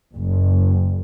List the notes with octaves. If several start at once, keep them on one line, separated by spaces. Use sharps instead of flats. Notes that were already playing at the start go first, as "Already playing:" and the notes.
F#1